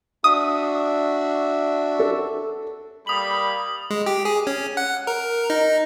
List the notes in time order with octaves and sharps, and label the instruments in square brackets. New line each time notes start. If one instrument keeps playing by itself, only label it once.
[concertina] D4 F#4 E5 [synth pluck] D#6
[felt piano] A4
[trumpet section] G3 A#3 B5 [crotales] D#6 F#7
[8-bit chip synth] G#3
G4
G#4
C#4
F#5
A#4
D#4